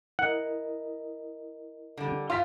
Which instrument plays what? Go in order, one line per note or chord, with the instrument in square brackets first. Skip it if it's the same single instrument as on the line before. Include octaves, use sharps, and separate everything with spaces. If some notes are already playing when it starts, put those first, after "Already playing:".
[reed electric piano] E4 A#4 D#5 [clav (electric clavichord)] F#5
[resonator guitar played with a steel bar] D3 G3
[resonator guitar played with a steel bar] F4 C5 F5 [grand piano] C6 B6